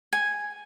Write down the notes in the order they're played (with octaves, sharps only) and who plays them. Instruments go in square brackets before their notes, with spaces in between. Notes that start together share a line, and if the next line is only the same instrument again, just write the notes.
[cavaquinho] G#5